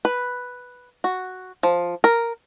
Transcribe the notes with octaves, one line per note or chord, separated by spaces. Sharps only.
B4
F#4
F3
A#4